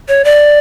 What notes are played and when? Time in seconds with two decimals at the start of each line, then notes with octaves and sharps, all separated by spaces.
0.08 C#5
0.25 D5